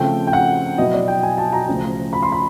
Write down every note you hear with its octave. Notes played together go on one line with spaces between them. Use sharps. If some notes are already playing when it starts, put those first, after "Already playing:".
Already playing: C#3 F3 A3 C4 G5
G5
F#5
B2 F#3 B3 E4 D#5
D5
G5
G#5
A5
A#5
D2 C#3 F3
B5
C6
B5